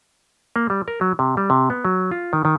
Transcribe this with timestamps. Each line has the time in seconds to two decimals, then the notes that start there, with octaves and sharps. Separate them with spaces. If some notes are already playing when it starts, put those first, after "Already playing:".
0.56 A#3
0.70 G3
0.88 A#4
1.01 F#3
1.19 C3
1.37 G3
1.50 C3
1.70 B3
1.85 F#3
2.11 F4
2.33 D#3
2.45 D#3